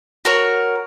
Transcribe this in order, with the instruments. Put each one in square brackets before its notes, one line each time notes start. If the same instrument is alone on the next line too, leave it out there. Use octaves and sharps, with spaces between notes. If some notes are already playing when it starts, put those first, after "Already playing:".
[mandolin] F#4 A#4 C#5